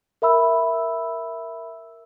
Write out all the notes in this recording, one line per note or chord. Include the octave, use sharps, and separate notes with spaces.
A#4 E5 B5 E6